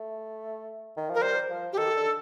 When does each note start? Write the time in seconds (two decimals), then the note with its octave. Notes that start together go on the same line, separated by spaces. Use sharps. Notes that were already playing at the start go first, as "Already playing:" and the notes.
Already playing: A3
0.97 D#3
1.09 F3
1.14 A#4
1.22 G3 C5
1.50 F3
1.73 G4
1.77 D#3 A4
1.96 D3